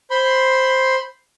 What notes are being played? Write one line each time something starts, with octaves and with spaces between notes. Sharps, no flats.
C5 B5 C6